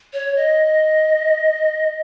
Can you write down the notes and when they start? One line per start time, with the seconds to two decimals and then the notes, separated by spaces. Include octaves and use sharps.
0.13 C#5
0.36 D#5